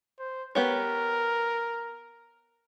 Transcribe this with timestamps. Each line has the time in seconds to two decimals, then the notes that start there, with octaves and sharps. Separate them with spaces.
0.19 C5
0.55 B3 G4 A#4 C#5